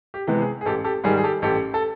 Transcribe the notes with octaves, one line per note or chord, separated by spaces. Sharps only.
G4
C3 E3 G#3 B3
G#4
G#4
A1 G4 A4
G4 A4
G#2 D#3 G3 G#4
G#4
G4 A4
A1 G4 A4
A4